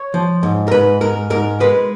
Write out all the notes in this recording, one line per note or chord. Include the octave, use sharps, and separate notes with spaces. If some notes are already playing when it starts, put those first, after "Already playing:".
Already playing: C#5
F3
G#2
A#4
G#2 B4
G#2 A#4
G#2 A#4
G#3 B4